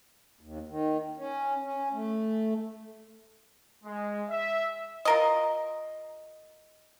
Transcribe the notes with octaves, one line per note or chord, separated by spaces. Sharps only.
D#2
D#3
C#4
C#4
A3
G#3
E5
F4 A#4 D#5